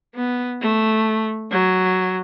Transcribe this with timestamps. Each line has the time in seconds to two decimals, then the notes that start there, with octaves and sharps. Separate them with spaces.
0.15 B3
0.61 A3
1.51 F#3